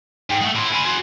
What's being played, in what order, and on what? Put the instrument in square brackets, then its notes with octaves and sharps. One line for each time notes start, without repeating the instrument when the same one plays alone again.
[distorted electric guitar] G#2 [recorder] G5
[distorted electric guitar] G#3 A3 [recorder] F#5
[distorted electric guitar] A2 E4 [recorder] C6
[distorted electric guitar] C5 G#5 [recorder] B5
[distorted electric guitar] F#4 G#4 [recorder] C6